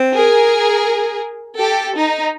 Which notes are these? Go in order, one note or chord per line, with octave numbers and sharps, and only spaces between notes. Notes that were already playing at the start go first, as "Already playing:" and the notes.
Already playing: C4
G#4 A#4
G4 A4
D#4